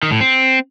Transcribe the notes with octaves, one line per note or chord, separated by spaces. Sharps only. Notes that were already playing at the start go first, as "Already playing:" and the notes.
D#3
A2
C4